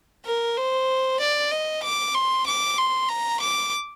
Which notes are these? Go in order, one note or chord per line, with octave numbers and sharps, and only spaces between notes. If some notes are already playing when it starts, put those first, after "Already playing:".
A#4
C5
D5
D#5
D6
C6
D6
C6
A#5
D6